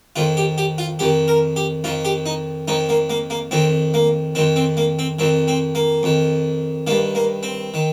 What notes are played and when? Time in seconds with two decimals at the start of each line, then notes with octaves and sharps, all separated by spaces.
0.16 F2 D#3 F4
0.37 G4
0.58 G4
0.78 F4
0.99 F2 D#3 G4
1.28 A#4
1.56 G4
1.84 F2 D#3 F4
2.05 G4
2.26 D#4
2.68 F2 D#3 D#4
2.89 A#3
3.10 A#3
3.30 A#3
3.51 F2 D#3 C4
3.94 A#3
4.35 F2 D#3 C4
4.56 C4
4.77 A#3
4.99 C4
5.19 F2 D#3 C4
5.48 C4
5.75 A#3
6.03 F2 D#3
6.87 D#3 A#3
6.91 G2
7.15 A#3
7.43 C4
7.74 D#3